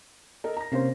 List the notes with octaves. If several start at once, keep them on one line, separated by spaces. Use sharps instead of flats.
A4 A#4 D#5
A#5 A#6
C3 A#3 C#4 C5 F5